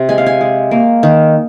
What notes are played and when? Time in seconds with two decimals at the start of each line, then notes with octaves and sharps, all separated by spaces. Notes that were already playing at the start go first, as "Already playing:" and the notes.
Already playing: C3
0.09 G#3 G#5
0.18 F5
0.26 G#5
0.41 G#3
0.71 A#3
1.03 D#3